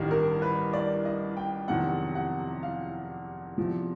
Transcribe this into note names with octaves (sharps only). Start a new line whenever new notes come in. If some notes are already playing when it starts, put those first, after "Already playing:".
Already playing: A1 G2 D#3 G3 D#5
A#4
B4
D5
D#5
G5
F1 E2 C3 D#3 F#3 F#5
F#5
F5
E2 C3 F3